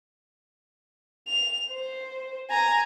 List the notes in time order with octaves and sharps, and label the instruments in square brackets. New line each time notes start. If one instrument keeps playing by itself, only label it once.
[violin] F7
C5
G#5 A#5